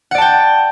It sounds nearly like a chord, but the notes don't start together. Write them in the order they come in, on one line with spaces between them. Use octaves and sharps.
F#5 D5 A5 G5